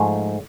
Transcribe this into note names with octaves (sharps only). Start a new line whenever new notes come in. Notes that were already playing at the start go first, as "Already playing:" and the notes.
Already playing: G#2 F3 A3 G#4